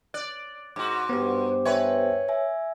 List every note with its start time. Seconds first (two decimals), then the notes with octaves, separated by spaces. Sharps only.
0.14 D5 F#6
0.76 G#2 F#4 D6
1.09 G2 B3 G4 C5
1.65 B4 C#5 E5 G5 G#5
2.28 E5 G#5